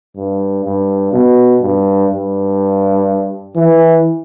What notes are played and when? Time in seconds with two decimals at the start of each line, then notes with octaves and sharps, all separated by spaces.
0.16 G2
0.65 G2
1.13 B2
1.61 G2
2.11 G2
3.56 E3